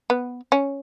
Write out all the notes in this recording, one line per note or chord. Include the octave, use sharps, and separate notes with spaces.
B3
C#4